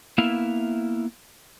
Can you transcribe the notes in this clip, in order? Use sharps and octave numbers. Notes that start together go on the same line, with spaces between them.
A#3 B3 E4 E5 F5